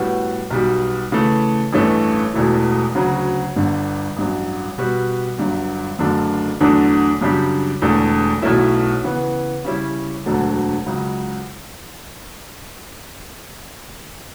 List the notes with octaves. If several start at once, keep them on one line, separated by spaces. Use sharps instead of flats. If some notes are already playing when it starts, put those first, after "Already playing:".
Already playing: A2 G3 B3 F#4
B1 B2 G3
C#3 E3 A3
A1 G2 E3 A3 C#4
E1 E2 B2 A3 E4
D2 C#3 F#3
G1 G2 D3
A1 G2 F#3
B2 G3 B3 F#4 B4
G1 G2 F#3
F#1 F#2 D3 A3 D4
E2 D3 F#3 A3 D4
F#2 C#3 G3 D4 G4
E1 E2 D3 A3
B1 B2 A3 C#4 E4
C#3 E3 B3
C#3 G3 C#4 E4
E1 D2 D3 F#3 A3
C#2 C#3 F#3